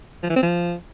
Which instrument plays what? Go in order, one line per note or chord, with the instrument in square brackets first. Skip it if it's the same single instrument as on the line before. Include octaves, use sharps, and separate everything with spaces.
[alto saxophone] F3
E3
C4
F3